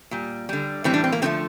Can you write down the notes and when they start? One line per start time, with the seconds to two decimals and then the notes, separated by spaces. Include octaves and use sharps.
0.11 A#2 G3
0.49 D3 G3
0.84 A2 E3 G3 C4
0.94 D4
1.04 C4
1.12 A#3
1.22 D3 F3 A3 C4